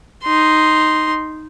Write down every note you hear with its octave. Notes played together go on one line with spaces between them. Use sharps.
D#4 C6